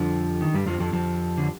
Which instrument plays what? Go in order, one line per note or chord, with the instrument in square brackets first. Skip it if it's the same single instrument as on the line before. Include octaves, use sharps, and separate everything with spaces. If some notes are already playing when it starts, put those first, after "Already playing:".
Already playing: [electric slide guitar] F2 F3 [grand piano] D3 G3 G4
[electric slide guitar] D#3
G2 G3
F2 F3
F2 F3
F2 F3
D3